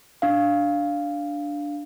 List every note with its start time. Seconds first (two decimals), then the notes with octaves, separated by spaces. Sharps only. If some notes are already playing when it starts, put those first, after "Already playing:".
0.22 D4 F5